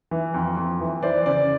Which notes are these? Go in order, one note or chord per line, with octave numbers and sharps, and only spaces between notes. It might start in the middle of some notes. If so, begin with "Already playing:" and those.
E3
F2
F2
E3
E3 C5 D5
C#3 C5 D5